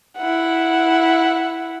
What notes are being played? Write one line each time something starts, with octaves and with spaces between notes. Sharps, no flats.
E4 F#5